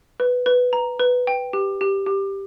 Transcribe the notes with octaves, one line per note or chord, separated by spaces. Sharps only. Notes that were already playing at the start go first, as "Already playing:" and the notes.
B4
B4
A#5
B4
G5
G4
G4
G4